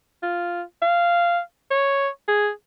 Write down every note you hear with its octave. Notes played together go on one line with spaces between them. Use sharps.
F4
F5
C#5
G#4